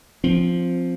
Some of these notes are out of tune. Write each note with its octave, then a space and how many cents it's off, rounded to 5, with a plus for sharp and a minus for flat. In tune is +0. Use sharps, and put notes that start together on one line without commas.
F3 +0 C4 +0